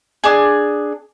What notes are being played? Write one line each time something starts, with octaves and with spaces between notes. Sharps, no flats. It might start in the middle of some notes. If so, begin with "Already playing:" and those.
D4 G#4